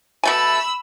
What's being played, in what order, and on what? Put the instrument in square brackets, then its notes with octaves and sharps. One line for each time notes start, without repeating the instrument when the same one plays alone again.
[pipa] B2 A3 G#5 [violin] B5 E6